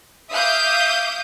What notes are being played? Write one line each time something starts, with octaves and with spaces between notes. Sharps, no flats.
E5 F5 D6 D#6 G6